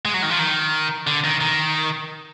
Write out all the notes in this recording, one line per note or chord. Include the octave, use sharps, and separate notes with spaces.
G#3
F#3
D#3
F3
D#3
D3
D#3
D#3